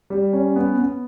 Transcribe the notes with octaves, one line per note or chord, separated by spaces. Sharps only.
G3
C#4
B3
B3